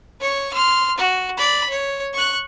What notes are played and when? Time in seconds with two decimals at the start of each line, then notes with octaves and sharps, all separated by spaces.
0.20 C#5 C#6
0.53 C6 F6
0.98 F#4
1.37 D5 B5
1.70 C#5
2.13 C#6 F#6